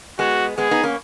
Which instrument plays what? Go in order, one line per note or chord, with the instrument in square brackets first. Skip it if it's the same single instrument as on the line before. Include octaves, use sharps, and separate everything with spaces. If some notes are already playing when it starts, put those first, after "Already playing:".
[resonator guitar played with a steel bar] G#3 B3 [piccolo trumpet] F#4
[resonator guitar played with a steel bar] G#3 B3 [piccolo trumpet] G#4
[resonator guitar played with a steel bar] B3 D#4
A#3 C#4